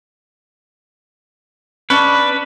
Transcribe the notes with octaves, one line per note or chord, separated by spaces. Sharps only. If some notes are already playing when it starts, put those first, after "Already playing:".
C#4 D4 B4